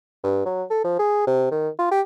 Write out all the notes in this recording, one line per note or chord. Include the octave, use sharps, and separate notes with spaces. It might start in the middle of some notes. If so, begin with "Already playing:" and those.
G2
F#3
A4
F3
G#4
C3
D#3
F4
G4